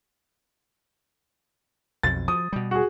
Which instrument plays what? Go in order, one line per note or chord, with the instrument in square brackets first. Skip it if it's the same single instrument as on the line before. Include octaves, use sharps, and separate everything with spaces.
[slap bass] B1 F2 [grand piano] A6
[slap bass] F3 [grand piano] D#6
[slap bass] B2 G3
[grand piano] F#4 G#4